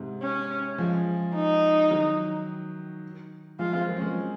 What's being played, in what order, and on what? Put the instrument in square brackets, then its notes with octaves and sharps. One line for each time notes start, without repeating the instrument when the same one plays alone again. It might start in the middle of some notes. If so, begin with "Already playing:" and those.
Already playing: [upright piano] G#2 C3
[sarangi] C#4
[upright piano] F3 G#3
[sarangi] D#4
[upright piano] D#3 F#3
[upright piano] F3 G#3 [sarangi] F4
[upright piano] G#3 C4
F#3 A#3
C#4
G#3 C4